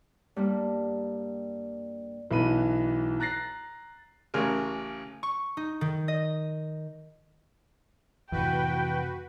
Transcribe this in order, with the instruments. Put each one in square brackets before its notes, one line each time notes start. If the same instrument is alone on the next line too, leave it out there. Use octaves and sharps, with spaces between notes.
[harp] G2 G3 A#3
[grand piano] B1 E3 B3 B5 D#7
A#5 F#6 A6 A#6 C7
[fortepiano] A1 C#3 A#4
[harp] C#6
D#4
D#3
D#5
[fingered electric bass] F2 A2 C3 [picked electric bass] E3 [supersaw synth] F#4 B4 [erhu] G5